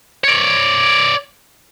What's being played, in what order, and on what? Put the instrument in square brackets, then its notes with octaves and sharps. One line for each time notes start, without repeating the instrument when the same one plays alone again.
[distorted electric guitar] C#5 D5